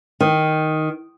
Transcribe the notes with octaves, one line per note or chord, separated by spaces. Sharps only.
D#3